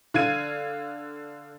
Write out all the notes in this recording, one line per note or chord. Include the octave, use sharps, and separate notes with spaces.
D3 F5 G#6 D#7